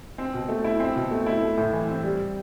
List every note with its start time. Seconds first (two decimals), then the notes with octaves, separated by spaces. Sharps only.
0.18 C4
0.34 B2
0.49 A3
0.64 E4
0.80 C4
0.96 B2
1.11 A3
1.26 E4
1.42 A3
1.57 A2
1.73 E3
1.88 C4
2.03 G3